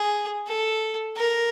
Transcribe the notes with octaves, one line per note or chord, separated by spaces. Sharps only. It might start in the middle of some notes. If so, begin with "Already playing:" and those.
Already playing: G#4
A4
A#4